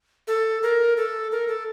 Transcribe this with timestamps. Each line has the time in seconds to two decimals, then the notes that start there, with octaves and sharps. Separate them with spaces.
0.28 A4
0.63 A#4
0.97 A4
1.32 A#4
1.48 A4